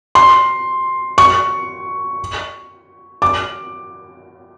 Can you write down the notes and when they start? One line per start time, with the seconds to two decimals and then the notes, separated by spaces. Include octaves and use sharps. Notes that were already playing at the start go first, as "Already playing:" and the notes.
0.15 C6
1.18 C#6
3.22 D6